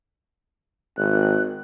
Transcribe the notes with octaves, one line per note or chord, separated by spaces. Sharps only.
G#1 F#6